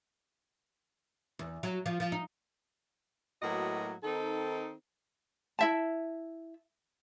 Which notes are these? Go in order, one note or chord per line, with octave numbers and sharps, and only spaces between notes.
E2
F#3
F3
F3
D#4
A2 F#3 A#3 B3 F#4 D#5
D#3 C4 D#4 A4
E4 E5 A5